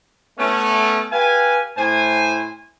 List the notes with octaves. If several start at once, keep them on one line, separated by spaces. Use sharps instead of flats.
A3 B3 C#4
G4 B4 F5 G#5
A2 C5 G#5